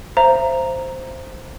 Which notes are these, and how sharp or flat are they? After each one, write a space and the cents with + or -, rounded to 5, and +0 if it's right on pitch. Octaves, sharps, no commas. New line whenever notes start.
C5 +0 E5 +40 A#5 +0